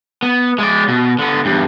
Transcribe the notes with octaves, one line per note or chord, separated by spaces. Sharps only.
B3
G#3 D5
B2
D3 B3
E2 G2